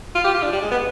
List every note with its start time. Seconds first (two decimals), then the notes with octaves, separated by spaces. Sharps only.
0.15 F4
0.24 G4
0.34 F4
0.42 D4
0.52 G3
0.62 G#3
0.71 B3